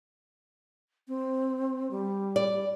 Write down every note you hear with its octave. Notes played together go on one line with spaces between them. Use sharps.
C4
G3
D5